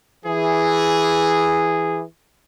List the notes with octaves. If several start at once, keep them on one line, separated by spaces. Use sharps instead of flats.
E3 G#4